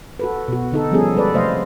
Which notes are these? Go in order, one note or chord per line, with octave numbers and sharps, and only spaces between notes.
F#4 A4 B4
B2 F#4
D3 D#4 A4
F3 G3 B3 C#4 G#4 A4
G3 G#3 A4 B4 D5
C3 F#3 A3 C5 D#5 F5